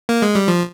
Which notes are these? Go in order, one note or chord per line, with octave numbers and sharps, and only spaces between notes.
A#3
G#3
G3
F3